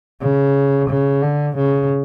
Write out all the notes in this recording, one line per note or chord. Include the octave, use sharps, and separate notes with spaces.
C#3
C#3
D3
C#3